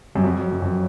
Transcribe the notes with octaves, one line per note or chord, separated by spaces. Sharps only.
F#2 G3
F2 F#3
F#2
F2